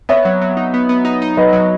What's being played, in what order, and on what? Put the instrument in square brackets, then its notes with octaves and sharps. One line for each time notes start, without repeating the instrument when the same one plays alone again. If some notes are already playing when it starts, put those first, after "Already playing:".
[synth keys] B3 [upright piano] C#5 E5
[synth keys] F#3
F#3
D#4
B3
B3
D#4
D#4
[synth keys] F#3 [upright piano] B4 D#5
[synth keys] F#3